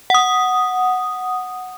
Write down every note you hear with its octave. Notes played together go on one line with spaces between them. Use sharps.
F#5 D#6